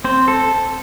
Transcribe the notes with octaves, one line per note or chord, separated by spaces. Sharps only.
C4 C5
A4